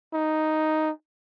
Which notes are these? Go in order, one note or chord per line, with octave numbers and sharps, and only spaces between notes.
D#4